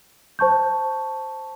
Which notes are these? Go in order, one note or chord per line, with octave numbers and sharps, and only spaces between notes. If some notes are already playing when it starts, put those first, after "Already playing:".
C5 A5 C#6 G6